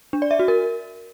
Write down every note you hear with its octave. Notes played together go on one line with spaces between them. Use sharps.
D4
D5
E5
F#4
A#4